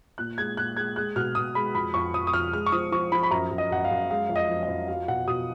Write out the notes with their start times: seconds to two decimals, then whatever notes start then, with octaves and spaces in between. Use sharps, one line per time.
0.18 A#2 F#6
0.38 G#3 G#6
0.57 A#2 F#6
0.77 G#3 G#6
0.96 G#3 F#6
1.16 B2 F6
1.35 B2 D#6
1.55 G#3 B5
1.75 F2 B5
1.94 F2 C#6
2.14 F2 D#6
2.27 D#6
2.33 F2 F6
2.53 G#3 F6
2.66 C#6
2.72 F3 D#6
2.92 F3 C#6
3.12 F3 B5
3.23 B5
3.31 F#2 A#5
3.51 F#2
3.58 D#5
3.71 F#2 F#5
3.84 F5
3.91 F#2
4.11 G#3 F5
4.29 F2
4.36 D#5
4.49 F3
4.63 D#5
4.69 F2
4.88 F#3 F5
5.08 B2 F#5
5.27 B2 D#6